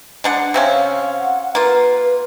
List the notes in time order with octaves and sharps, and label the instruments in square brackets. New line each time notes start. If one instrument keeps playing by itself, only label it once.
[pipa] G#3 D4 F#5
[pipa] C3 C4 C#4 [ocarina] F5
[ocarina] F#5
[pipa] A#3 F4 [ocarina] B4